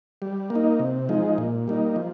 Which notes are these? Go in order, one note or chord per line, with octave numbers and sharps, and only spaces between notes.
G3
A#3
D#4
C3
F3 G#3 D#4
A#2
G3 A#3 D#4
F3